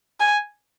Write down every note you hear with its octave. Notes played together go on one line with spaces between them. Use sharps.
G#5